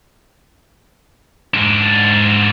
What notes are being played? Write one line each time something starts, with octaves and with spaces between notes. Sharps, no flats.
G#2 D4